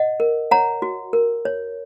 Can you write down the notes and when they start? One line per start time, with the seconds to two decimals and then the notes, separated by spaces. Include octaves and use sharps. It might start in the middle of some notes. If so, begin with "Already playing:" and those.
Already playing: D#5 F#5
0.20 A#4
0.51 C#5 F#5 A#5
0.82 F#4
1.13 A#4
1.45 C#5